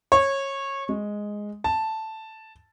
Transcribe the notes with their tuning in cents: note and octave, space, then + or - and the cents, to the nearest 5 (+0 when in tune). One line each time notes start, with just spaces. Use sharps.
C#5 -20
G#3 +0
A5 +0